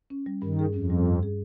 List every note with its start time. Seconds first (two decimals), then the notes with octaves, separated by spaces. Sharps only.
0.10 C#4
0.26 G3
0.42 G2 D#3
0.59 G#4
0.74 F2 C#4
0.90 G3
1.06 G2
1.23 G#4